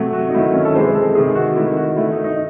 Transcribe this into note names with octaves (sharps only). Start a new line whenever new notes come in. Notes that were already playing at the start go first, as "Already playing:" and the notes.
Already playing: C3 F#3 A3
F#4
D#4
D#3 F#3 A3 E4
C#4
A4
C3 E3 G#3 C5
A4
C3 D#3 G#3 G#4
F#4
D#3 A3 E4
F#4
D#3 A3 E4
D#4
D#4